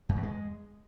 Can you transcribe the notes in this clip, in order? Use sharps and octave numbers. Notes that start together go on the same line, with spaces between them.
F#2
E2
G#3